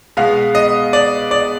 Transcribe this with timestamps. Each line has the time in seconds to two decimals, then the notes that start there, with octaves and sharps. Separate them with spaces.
0.17 B2 G#3 B3 F5
0.55 D#5
0.93 D5
1.31 D5